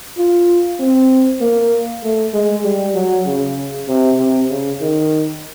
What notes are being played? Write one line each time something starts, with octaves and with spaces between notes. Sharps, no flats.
F4
C4
A#3
A3
G#3
G3
F#3
C#3
C3
C3
C#3
D#3